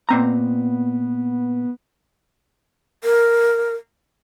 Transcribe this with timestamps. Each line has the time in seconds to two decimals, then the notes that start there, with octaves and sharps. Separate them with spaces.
0.09 A#2 B3 C4 A#5
3.04 A#4